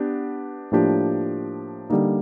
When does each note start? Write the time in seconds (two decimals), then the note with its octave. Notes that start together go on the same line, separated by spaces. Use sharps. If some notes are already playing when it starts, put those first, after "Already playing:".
Already playing: B3 D4 G4
0.72 A2 F3 A#3 D4 G4
1.90 D3 G3 A#3 D#4